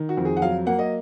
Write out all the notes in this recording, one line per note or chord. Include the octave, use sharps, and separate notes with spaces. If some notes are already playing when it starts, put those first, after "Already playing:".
Already playing: D#3
F#4
F2
G#4
F#5
F#3 F5
A#3 F#5
D#5